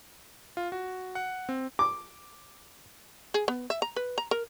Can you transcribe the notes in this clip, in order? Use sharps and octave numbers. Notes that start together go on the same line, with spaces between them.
F4
F#4
F#5
C4
D6
G#4
B3
E5
A#5
B4
A#5
A#4